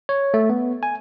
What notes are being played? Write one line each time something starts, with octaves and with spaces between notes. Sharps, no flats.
C#5
A3
B3
G#5